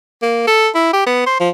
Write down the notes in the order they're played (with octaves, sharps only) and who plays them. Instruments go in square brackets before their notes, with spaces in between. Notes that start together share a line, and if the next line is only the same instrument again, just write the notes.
[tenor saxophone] A#3
A4
E4
G4
B3
C5
F3